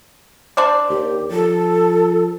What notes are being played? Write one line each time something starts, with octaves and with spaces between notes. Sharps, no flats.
D4 C5 D5
D#2 G4
F3 A4